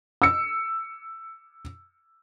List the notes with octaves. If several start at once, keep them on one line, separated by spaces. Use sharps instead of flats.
E6 C#7